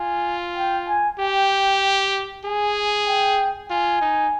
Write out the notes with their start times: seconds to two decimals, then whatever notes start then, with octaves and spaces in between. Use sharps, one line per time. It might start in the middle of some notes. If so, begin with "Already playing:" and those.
Already playing: F4 G#5
0.57 G5
0.88 G#5
1.19 G4 G5
2.45 G#4 G#5
3.07 G5
3.70 F4 G#5
4.01 D#4